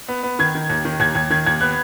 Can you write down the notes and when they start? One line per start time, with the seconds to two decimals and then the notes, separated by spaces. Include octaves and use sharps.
0.08 B3
0.23 B3
0.39 D#3 G#6
0.55 D#3
0.70 D#2
0.85 D#3
1.00 D#2 G#6
1.15 D#2 G#6
1.30 D#3 G#6
1.46 D#2 G#6
1.61 B3 F#6